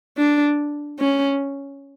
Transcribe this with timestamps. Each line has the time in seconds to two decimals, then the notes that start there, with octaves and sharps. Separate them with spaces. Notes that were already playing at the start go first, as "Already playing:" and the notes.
0.17 D4
0.99 C#4